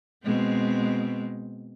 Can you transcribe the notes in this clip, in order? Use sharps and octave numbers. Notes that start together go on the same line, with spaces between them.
B2 G#3 C4